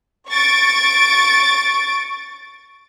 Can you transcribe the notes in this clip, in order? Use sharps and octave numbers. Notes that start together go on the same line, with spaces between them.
C#6 A6 D7